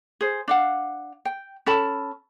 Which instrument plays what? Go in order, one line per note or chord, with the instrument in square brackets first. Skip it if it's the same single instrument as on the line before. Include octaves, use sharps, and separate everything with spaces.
[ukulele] G#4 C5
D4 F5 F#5
G5
C#4 A4 A5 B5